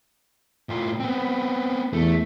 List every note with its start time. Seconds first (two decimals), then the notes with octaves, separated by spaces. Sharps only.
0.69 A2 F4
1.00 B3 C4
1.93 E2 A3